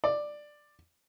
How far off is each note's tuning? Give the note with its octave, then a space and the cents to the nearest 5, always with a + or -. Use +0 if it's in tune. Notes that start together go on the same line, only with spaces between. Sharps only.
D5 +10